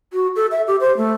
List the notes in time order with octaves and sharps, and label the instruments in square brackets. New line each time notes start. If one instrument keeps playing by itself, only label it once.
[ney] F#4
A4
E5
G4
C5
A3